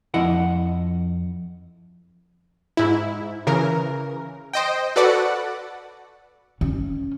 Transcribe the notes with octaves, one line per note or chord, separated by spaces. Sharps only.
F2 E4 D#5 F#5
G#2 E4
C#3 E3 A#4
C5 D#5 G5
F#4 A4 B4 D5 F#5
C#4